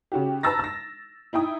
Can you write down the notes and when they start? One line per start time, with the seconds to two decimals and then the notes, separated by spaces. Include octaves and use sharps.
0.12 C#3 F#4 G4
0.43 B4 A5 A#5 E6 A6 A#6
0.59 E6 A#6
1.33 D#4 E4 G5 D#6